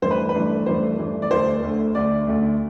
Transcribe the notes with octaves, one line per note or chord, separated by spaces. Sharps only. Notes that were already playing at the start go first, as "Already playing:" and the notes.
G2 E3 A3 D4 C5
B4
B4
G2 E3 A3 D4
G2 E3 A3 D4 C5
G2 E3 A3 D4
D5
D2 D3 A3 C5
D2 D3 A3
D2 D3 A3 D5
D2 D3 A3